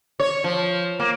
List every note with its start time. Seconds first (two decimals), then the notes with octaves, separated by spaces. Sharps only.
0.20 C#5
0.44 F3
1.00 A#3